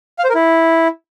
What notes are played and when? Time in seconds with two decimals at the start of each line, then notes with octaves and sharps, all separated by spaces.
0.19 F5
0.24 C5
0.29 A#4
0.35 E4